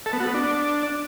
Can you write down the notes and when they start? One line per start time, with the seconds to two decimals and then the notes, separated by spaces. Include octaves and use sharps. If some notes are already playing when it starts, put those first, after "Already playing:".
0.06 A4
0.13 B3
0.20 F#4
0.27 B3
0.34 D4